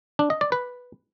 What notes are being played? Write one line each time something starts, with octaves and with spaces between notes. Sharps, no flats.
D4
D#5
D5
B4